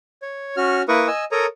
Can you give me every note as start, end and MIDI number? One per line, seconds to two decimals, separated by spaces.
0.22 0.56 73
0.57 0.83 61
0.57 0.83 66
0.57 0.83 89
0.88 1.07 58
0.88 1.07 64
0.88 1.07 70
0.88 1.07 71
0.88 1.07 85
0.88 1.07 87
1.07 1.25 75
1.07 1.25 80
1.07 1.25 88
1.32 1.46 69
1.32 1.46 70
1.32 1.46 73
1.32 1.46 82
1.32 1.46 87